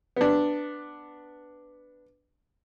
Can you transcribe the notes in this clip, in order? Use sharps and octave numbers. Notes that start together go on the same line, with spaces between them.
B3 D4